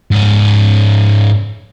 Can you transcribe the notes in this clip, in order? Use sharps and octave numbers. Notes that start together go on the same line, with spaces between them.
G#2 C#4